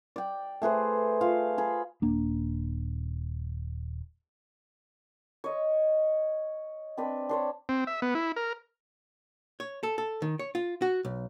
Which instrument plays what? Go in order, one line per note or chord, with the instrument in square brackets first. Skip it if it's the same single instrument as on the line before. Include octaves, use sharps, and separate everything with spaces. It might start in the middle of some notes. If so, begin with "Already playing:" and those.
[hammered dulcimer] D5 G5
A3 G#4 B4 C5
F4 C5 F5
G#4 B5
[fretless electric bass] D#1 A#3 D4
[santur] C#5 D#5
C4 D4 B4
D4 C5 C#5
[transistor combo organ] C4
E5
B3
E4
A#4
[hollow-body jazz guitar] C#5
A4
A4
D#3
C#5
F4
F#4
B1